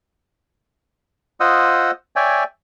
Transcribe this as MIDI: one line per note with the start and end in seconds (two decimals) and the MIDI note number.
1.40 1.91 65
1.40 1.91 72
1.40 1.91 75
1.40 1.91 78
1.40 1.91 87
1.40 1.91 88
2.16 2.44 73
2.16 2.44 74
2.16 2.44 76
2.16 2.44 79
2.16 2.44 80